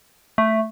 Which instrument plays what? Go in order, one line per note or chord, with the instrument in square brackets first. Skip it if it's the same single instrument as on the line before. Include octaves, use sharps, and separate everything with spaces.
[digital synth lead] A3